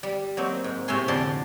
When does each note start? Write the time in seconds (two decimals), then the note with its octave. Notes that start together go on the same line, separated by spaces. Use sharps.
0.03 G3
0.37 F#3 A#3 C4 D#4
0.64 G#2
0.88 A2 C3 C#5 E5 G#5 C6
1.08 F2 D3 D5 A5 C6